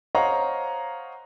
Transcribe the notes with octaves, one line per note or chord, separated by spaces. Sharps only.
C5 C#5 D#5 F5 F#5 A#5